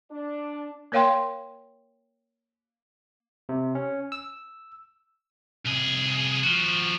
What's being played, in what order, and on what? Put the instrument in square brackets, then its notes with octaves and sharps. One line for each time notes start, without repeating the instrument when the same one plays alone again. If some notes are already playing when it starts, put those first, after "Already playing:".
[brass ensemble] D4
[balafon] A#3 A#4 C#5 F5 G5 C6
[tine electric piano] C3
C#4
E6
[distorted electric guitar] C2 G#4
F3 F#4